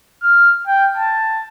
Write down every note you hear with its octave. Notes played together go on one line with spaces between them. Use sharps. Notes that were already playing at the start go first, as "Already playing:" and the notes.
F6
G5
A5